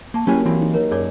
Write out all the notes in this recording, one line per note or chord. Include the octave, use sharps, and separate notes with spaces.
A#3 A5 C#6
F#3 A#3 C#4 E4 G4 C#5 G#5
E3 C4 E4
D#4
A#4 C#5
F#2 G#4 C#5 D5